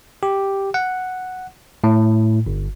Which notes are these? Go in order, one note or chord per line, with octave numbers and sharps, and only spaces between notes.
G4
F#5
A2
G1